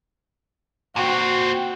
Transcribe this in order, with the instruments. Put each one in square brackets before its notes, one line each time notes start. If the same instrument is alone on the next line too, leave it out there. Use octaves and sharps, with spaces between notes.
[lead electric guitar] A#2 C4 [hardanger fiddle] F#4